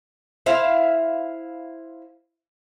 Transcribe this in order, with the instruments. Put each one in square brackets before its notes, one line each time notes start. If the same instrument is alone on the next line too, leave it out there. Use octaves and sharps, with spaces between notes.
[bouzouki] E4 C5 F5